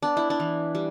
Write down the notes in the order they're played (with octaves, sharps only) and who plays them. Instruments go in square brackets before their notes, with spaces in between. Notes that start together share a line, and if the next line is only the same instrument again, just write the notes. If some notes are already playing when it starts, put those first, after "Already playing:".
[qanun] B3 D4
E4
D4
E3
G3